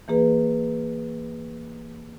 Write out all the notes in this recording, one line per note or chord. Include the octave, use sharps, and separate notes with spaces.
E3 A#3 G#4 B4